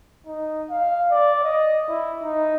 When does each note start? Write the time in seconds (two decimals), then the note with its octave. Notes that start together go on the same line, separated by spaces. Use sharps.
0.27 D#4
0.70 F5
1.11 D5
1.44 D#5
1.88 E4
2.23 D#4